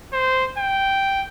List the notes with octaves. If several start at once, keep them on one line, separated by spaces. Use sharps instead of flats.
C5
G5